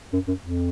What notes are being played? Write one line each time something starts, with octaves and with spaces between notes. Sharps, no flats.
F#2
F#2
F2